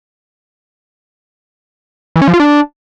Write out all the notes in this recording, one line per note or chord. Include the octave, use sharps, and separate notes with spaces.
E3
C#4
F3
F4
D4